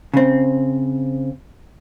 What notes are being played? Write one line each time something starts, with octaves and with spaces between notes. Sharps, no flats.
C#3 C4